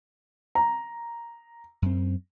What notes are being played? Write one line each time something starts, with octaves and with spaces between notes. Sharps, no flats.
A#5
F#2 C4